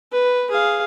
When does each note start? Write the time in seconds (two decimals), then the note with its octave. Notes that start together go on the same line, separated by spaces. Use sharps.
0.12 B4
0.51 G#4 F5